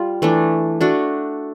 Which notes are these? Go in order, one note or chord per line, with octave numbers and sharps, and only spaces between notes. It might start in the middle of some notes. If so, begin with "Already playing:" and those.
Already playing: G3 F4
E3 A3 D4
A3 D4 F#4